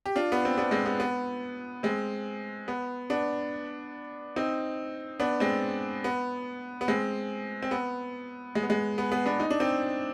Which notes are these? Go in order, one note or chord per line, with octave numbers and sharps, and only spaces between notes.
G4
D4 F4
B3
C4
B3 D4
G#3 C4
B3
B3
G#3 C4
B3
B3 D4
C4 D#4
B3 D4
G#3 C4
B3
B3
G#3 C4
C4
B3
G#3
B3
G#3
B3
B3
B3 D4
D#4
D4
C4 D#4